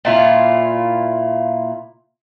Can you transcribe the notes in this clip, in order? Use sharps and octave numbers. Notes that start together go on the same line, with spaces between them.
A#2 E4 F4